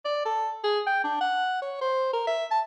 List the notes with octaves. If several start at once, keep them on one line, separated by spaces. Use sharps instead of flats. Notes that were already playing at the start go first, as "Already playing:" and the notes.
D5
A4
G#4
G5
D4
F#5
C#5
C5
A#4
E5
A5